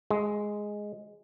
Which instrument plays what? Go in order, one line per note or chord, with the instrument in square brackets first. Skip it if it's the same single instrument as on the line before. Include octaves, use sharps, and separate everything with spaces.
[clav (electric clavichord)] G#3